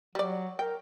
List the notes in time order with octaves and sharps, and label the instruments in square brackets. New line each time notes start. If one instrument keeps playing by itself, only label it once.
[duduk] F#3 [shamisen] G3 D5
[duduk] A#4 [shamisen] G5